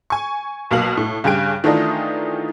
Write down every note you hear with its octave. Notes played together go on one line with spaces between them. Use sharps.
G#5 C#6
B1 B2 A#3 F5 F#7
A2
G2 C#3 G4 G#5 D7
D#3 E3 A3 D4 D#4 F4